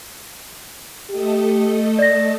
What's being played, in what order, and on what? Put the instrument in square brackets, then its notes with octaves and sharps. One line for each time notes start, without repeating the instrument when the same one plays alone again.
[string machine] A3 A4 D#5 [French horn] G4
[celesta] D5 A#6